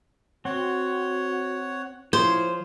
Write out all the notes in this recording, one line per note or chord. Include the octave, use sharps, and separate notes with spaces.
C4 F#4 C#5 F#5
F3 E4 C5 C#5